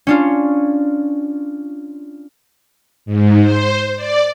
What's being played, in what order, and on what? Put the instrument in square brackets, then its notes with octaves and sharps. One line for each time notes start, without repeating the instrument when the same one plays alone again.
[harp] C#4 D4 F4
[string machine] G#2
C5
D5